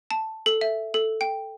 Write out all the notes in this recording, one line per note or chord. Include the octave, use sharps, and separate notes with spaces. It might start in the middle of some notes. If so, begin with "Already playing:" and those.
A5
A4
E5
A4
G5